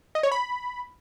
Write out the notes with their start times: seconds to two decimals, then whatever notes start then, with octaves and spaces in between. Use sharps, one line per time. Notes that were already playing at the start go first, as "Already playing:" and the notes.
0.15 D#5
0.23 C#5
0.32 B5